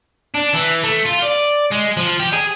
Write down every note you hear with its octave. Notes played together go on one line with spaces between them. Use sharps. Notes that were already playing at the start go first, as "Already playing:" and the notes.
D4
E3
A3
F4
D5
G#3
F3
G4
G#4